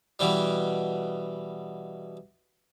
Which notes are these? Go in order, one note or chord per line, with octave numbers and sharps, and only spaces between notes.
B2 E3 G3